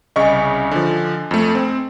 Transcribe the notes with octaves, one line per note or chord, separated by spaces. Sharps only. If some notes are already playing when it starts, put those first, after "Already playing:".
C2 C#3 D#5 G#5 C#6
D3 F3
F2 A3
C4